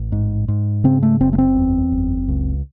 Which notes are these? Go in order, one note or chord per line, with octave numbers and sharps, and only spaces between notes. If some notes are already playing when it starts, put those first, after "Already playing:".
Already playing: A1
G#2
G#2
C#3 C4
A3
F#1 C4
A3
C4
E2
F#1
C#2